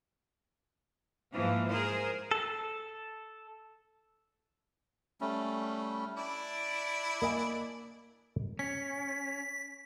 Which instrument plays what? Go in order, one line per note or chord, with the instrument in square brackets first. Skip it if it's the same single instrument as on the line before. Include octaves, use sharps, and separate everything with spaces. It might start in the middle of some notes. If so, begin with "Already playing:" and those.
[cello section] G#2 E3 F3 A#3
G#4 A#4 C5
[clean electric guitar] A4
[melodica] G3 A3 C#4
[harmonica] D4 E4 D5
[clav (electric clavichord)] A#3 D#5 G#5
[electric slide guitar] C#4 [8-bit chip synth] B6